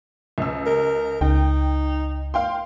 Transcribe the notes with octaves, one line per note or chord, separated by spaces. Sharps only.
C#2 E6
A#4
C#2 D#4 G5
F5 G5 C6